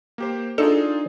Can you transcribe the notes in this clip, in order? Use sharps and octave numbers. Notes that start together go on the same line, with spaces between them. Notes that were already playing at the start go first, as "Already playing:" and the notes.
A#3 G4 C5
D4 D#4 F4 G#4 A4